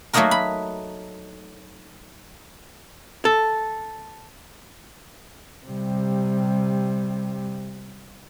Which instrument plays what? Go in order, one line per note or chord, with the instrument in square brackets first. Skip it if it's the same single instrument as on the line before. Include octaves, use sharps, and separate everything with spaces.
[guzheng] F#3 A3 A#3 D#4 F#4 A#4
B5
[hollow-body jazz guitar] A4
[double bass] C3 G3